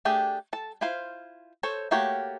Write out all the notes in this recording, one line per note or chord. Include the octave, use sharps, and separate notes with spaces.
A3 D4 G4 G#4
A4 A5
E4 F4 C5 F5
A4 C5 C#5
A3 A#3 F#4 G4 C#5